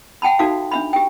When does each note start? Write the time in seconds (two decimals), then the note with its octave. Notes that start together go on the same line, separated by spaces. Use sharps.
0.22 F#5 G5 A5 B5
0.39 D#4 F#4 A4 E5 F5
0.72 D4 E5 B5
0.93 G4 G5